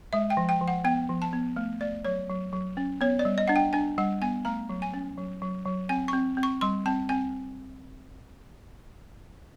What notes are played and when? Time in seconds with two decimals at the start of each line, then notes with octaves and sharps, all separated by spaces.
0.13 G#3 E5
0.30 G5
0.37 F3
0.49 G5
0.61 F3
0.68 F#5
0.84 B3 G5
1.09 F3
1.22 A5
1.33 B3
1.56 A3
1.81 A3 D5
2.05 F#3 C#5
2.30 F#3
2.53 F#3
2.77 C#4
3.01 B3 C#5
3.19 D5
3.25 G3
3.38 D#5
3.48 D4 F#5
3.56 G5
3.73 D4 G#5
3.98 G3 F#5
4.22 B3 G#5
4.45 A3 A#5
4.69 F#3
4.82 G#5
4.94 C#4
5.18 F#3
5.42 F#3
5.66 F#3
5.89 C4 G#5
6.08 C4 C#6
6.37 C4
6.43 C#6
6.61 G3 C6
6.86 C4 A5
7.09 C4 G#5